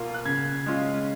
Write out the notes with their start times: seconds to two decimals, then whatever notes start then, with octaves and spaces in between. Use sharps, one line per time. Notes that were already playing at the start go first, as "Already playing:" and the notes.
Already playing: B2 A#3 F4
0.14 F#6
0.25 C#3 G#6
0.66 G#3 C#4 F4